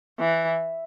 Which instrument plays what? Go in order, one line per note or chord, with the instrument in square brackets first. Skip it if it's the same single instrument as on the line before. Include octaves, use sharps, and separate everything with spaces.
[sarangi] E3